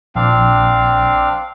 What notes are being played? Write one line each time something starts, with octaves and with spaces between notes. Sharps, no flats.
A#1 C4 D4 F5